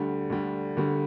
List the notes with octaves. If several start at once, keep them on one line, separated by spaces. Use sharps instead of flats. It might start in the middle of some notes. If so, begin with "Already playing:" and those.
Already playing: D2 D3 G3
D2 D3 G3
D2 D3 G3